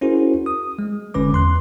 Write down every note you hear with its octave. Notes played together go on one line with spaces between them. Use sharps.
C#4 E4 F#4 G#4 A#4 C5
D#6
G#3
G1 D3 C#4 B4 D6
E2 C6 F#6